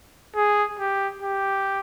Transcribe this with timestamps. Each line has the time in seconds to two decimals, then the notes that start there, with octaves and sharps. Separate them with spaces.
0.36 G#4
0.79 G4
1.22 G4